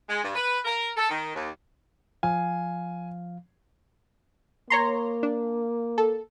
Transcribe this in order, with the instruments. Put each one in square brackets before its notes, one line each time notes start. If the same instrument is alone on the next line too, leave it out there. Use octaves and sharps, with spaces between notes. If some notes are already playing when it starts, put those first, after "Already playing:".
[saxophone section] G#3
G2
B4
A#4
A4
D#3
D#2
[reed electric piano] F3 F5 [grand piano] G#5
[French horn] A#3 [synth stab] C#5 A#5 C6
[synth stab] D4
A4